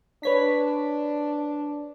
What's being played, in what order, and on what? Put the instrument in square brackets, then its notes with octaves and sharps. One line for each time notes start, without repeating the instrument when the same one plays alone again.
[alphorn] D4 [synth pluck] B4 C#5 B6